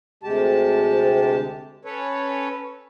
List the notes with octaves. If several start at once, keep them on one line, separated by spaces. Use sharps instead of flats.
D2 C3 G#3 G4 A5
C#4 A4 B4 C#5